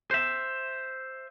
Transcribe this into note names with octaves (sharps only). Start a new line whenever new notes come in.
C5 E5